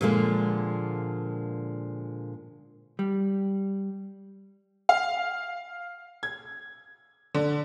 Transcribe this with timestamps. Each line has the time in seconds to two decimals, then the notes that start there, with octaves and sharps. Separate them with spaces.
0.01 A#2 D3 F3 G#3 A#3
2.99 G3
4.89 F5
6.23 G#6
7.35 D3